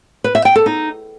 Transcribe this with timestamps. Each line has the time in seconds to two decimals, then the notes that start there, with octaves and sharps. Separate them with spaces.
0.24 B4
0.35 E5
0.45 G5
0.56 A4
0.66 D#4